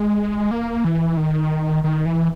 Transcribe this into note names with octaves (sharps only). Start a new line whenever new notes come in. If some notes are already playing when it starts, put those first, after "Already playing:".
Already playing: G#3
A#3
E3
D#3
D#3
E3